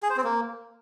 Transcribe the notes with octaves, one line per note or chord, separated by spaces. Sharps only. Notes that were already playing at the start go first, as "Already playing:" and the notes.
G#4
C5
C4
A#3